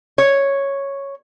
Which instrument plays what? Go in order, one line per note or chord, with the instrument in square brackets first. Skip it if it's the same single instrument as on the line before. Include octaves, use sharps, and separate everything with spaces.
[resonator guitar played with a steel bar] C#5